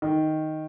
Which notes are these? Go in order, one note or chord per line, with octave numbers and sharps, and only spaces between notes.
D#3